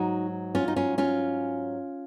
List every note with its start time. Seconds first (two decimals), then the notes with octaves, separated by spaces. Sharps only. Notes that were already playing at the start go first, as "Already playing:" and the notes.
Already playing: G#2 F#3 D#4 F#4
0.55 C#4 F4
0.68 D#4
0.76 C#4 F4
0.98 C#4 F4